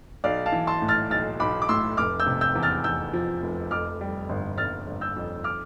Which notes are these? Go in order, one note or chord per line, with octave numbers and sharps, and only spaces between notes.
B1 D5 F5
F5 A5
E3
A5 C6
A2
F6 A6
B1 F6 A6
B1 B5 D6
D6
A2 C6 E6
F1 D6 F6
E6 G6
C3
E6 G6
E2
F6 A6
E2 E6 G6
F3
F1
F2 D6 F6
G3
G1
G1 F6 A6
G1
E6 G6
F2
D6 F6